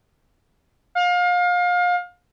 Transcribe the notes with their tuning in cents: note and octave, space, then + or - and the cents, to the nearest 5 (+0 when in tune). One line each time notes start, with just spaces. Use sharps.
F5 +30